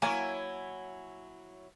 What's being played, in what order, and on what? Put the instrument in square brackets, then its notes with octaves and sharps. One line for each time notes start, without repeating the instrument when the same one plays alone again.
[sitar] F#3 E4 C#5 [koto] A#3 [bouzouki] G#5